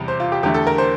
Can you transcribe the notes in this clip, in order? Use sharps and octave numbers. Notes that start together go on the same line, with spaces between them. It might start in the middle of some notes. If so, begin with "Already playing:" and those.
Already playing: E2 C3 G3
C5
F4
G4
E2 D3 A3 G4
A4
A#4
C5